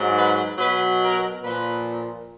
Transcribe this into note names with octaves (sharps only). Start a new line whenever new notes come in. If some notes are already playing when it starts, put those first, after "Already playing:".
Already playing: G#2 F#3
B4
B2 F#3 B4
A#4
A#2 F3 B4